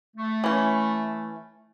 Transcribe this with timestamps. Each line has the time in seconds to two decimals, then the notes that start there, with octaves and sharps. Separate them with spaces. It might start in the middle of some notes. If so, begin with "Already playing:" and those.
0.17 A3
0.44 E3 C#4